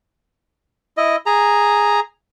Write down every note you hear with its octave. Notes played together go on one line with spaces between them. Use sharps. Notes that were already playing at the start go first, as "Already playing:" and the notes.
E4 D#5
G#4 A#5